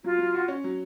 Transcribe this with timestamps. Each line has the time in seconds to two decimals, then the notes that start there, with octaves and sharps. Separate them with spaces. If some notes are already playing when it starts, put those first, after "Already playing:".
0.04 F#3 F4
0.19 F#3
0.34 F#4
0.48 C#4
0.64 F#3